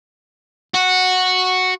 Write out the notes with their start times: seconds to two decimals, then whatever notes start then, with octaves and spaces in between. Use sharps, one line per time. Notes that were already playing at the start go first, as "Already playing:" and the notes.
0.74 F#4